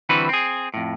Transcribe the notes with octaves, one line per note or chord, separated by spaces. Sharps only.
D3 E3 G3 C4 F#4 B4
C4 G#4
F2 A2